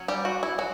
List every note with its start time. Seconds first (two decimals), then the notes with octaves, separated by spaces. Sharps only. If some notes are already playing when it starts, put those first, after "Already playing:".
Already playing: F#3 C#4
0.08 G3 G4
0.25 F#4
0.43 E4
0.58 F#3 F#4